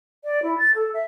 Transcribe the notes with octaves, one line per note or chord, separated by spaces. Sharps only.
D5
E4
A6
A4
E5